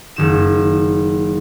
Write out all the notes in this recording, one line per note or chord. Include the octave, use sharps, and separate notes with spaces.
F#1 D#3 E7